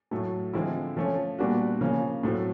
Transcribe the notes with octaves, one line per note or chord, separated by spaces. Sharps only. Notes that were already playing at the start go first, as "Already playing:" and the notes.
A2 F#3 A3
D3 F3 G#3 C4 E4
F3 A3 C#4
A#2 G3 B3 D4 F#4
C#3 F3 A#3 C#4
A2 F#3 A3 C4